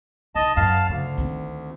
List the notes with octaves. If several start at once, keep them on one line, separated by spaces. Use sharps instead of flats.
B1 D#5 A5
F#2 F5 A5
D2 C#3
D#3 C4